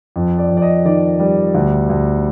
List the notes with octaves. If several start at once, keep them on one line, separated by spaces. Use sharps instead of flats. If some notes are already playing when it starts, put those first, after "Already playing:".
F2
D5
F2
D5
D#5
D#3 D5
G3
D2
D2